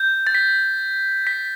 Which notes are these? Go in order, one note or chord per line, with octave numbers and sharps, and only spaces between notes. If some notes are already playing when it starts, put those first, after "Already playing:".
Already playing: G6
A6
B6
B6